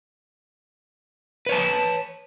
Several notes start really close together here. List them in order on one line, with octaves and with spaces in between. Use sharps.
B4 C#5 A5